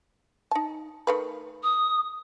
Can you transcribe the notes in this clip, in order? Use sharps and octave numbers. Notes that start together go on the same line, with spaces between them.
D#4 A5
D#3 A3 B4
D#6